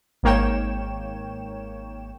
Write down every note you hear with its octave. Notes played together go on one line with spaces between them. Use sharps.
G#1 G#2 A#3 C#5 G5 E7